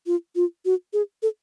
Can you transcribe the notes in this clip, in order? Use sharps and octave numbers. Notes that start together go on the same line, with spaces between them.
F4
F4
F#4
G#4
A4